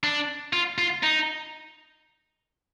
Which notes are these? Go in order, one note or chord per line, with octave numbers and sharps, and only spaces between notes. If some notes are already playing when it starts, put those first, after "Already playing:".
D4
F4
F4
D#4